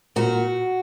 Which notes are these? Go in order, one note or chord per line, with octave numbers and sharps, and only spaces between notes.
A#2 F#4